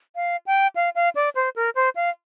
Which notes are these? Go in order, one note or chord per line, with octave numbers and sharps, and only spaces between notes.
F5
G5
F5
F5
D5
C5
A#4
C5
F5